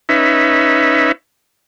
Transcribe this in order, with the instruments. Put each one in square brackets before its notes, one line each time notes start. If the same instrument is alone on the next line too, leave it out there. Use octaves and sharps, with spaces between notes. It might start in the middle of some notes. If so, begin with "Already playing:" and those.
[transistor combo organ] C#4 D#4 B4 E5